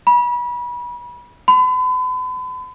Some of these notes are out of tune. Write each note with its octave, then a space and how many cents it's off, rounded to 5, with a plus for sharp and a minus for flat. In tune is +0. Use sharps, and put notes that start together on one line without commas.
B5 -30
B5 +40